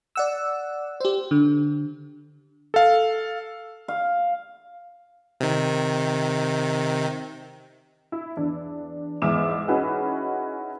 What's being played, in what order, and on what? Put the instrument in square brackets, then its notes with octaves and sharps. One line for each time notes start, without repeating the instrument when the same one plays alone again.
[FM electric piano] D5 F#5 E6
G4 C5
D3
[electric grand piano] A4 F5
[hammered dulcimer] F5
[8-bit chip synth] C3 D#3
[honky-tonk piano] E4
E2 D4
E2 G#2 E5 D6 F6 E7
C#4 D#4 E4 F#4 G#4 B4